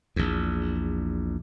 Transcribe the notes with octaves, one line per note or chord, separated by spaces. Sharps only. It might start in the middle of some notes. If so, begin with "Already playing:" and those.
A#1 E2